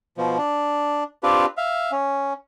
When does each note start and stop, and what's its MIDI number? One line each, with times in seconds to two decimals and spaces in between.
0.18 0.38 47
0.18 0.38 53
0.38 1.04 62
1.23 1.46 60
1.23 1.46 62
1.23 1.46 65
1.23 1.46 67
1.23 1.46 71
1.57 1.92 76
1.57 1.92 77
1.92 2.33 61